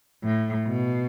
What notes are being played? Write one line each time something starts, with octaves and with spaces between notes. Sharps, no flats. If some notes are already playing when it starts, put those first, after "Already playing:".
A2
B2